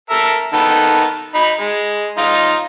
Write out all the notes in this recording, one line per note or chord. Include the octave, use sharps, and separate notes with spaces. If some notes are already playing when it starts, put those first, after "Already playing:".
A4 A#4 E5
D#3 B3 A4
D#4 B5
G#3
D#4 F4 D#5